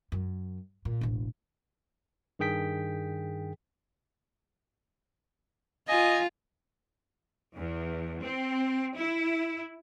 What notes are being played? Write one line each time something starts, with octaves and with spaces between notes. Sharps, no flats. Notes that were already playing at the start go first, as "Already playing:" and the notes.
F#2
A#2
E1 A1
G2 D#3 G#4 G5 B6
F4 D#5 G#5
E2
C4
E4